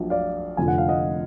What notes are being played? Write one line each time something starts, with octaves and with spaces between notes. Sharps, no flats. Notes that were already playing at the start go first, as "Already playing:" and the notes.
Already playing: A#1 A#2 F#3
D5 F5
F1 F2 D3 F3 G#5
F#5
F5
D#5 F#5